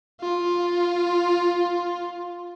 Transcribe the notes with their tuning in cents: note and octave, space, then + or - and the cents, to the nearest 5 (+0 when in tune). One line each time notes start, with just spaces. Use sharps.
F4 +5